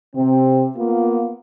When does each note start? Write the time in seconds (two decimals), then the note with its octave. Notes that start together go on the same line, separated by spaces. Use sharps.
0.14 C3 C4
0.75 A#3 B3 F4